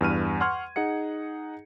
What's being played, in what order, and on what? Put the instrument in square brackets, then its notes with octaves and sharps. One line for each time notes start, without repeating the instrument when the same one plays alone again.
[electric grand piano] E2 G2 F6 D#7
F#5 C6 C#6 F6 G#6
D#4 G#4 F#5 C#7